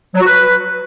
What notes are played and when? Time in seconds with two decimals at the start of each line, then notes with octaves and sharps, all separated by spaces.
0.15 F#3
0.20 F#4
0.26 B4